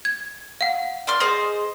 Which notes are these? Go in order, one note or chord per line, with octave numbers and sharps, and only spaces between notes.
G#6
F5 F#5
D5 C6 F6
G#4 C5 D#5 C6